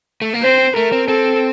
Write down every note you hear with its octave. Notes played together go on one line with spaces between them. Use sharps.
A3
A#3
C4 C5
A3 A#4
C4
C4 A4